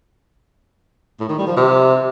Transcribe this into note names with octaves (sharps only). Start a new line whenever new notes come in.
A2
D#3
G3
F3
C3